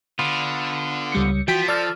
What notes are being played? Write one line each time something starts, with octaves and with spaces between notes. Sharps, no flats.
D3 B3 F4
C#2 G3 C#7
E3 F3 F#4 G5 B6
A4 D5 F6